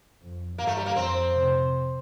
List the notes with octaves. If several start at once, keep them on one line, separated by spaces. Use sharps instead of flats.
F2
G2 A#3
A3
G3
A#3
F2 C4
C3